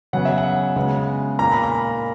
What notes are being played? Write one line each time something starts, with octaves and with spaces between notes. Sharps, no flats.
C#3 F#3 B3 F#5
E5
F#5
C#3 G#3 B3
A#2 A#3 A#5
B5
A#5